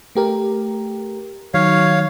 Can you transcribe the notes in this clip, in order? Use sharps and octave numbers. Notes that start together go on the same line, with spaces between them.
A3 G4 A#4
D#3 F#3 C#5 F5